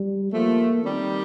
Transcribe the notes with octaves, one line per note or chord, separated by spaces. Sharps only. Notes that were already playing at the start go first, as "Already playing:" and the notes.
Already playing: G3
F3 A3 A#3
D#3 G3 C4